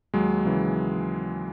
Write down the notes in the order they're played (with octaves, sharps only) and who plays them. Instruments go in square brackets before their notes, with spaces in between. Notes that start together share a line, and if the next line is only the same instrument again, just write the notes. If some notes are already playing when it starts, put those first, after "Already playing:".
[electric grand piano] D#2 F#3 G#3
C#3 E3